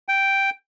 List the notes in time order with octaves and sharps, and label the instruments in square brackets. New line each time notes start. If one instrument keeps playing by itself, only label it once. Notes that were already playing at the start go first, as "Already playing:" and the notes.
[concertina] G5